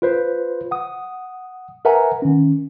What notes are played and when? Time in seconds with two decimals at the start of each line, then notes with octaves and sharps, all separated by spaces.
0.02 F4 B4 C5
0.71 F#5 D#6
1.85 A#4 B4 E5 F#5 G#5 A#5
2.22 D#3 C#4